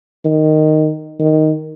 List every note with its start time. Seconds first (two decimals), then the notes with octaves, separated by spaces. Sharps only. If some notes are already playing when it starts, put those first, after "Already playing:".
0.25 D#3
1.20 D#3